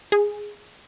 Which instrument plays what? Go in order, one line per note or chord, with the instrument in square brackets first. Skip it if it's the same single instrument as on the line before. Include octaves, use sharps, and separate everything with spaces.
[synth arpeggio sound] G#4